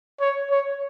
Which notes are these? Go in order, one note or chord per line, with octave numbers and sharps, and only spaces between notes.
C#5
C#5